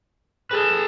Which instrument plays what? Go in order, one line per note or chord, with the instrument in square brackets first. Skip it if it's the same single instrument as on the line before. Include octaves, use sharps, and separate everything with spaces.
[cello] G#4 [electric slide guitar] A4 B4